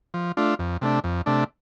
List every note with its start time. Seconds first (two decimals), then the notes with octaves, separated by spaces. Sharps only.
0.14 F3
0.37 A3 D4 F4
0.59 F2
0.81 C3 A3 D4
1.04 F2
1.26 C3 A3 D4